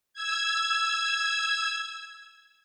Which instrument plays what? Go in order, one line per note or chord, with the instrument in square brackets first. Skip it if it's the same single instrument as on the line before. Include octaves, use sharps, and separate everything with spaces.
[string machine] E6 G#6